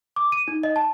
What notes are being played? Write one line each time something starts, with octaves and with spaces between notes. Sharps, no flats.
D6
D#7
D#4
D#5
A5